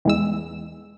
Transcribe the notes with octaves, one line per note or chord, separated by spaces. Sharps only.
E2 G#3 E6